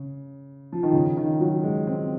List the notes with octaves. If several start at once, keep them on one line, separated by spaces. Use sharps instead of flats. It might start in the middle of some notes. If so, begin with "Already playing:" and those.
Already playing: C#3
F3
D#3
C#3
D#3
F#3
G#3
C4